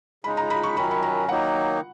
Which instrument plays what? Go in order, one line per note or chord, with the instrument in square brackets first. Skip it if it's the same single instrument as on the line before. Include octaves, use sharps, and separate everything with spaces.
[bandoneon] C#3 G#3 D#4 [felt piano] B5
[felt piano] A#5
B5
C#6
[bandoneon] F#2 D#3 F#3 C#4 [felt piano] B5
[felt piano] B5
A#5
[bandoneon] D#3 F#3 A#3 D#4 [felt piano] F#5